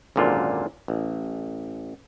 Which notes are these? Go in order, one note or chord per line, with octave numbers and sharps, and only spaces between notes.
G#1 F#2 A#2 D3 F4
A1